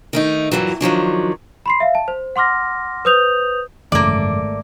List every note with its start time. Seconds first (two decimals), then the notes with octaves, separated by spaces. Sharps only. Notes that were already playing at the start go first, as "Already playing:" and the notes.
0.13 D#3 A3 D#4
0.51 G2 A#2 E3 F#3
0.81 D#3 F3 F#3 D4
1.66 B5 C6 C7
1.80 E5 F5
1.95 A5
2.08 C5
2.36 F#5 C6 D6 F6 A#6
3.05 B4 C5 D#6 G6 F7
3.92 G#1 F#2 C#3 E3 A3 A#3 D5